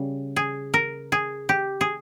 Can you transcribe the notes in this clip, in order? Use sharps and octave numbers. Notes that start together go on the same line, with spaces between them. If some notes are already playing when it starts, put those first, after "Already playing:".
Already playing: C#3 G3
G#4
A#4
G#4
G4
G#4